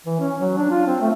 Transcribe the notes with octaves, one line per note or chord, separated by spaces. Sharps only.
E3
C#4
F#3
D4
F4
C4
A3